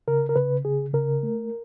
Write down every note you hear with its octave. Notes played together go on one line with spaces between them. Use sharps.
C#3 A#4
A#4
C#3 B4
C#3 G#4
C#3 A#4
A3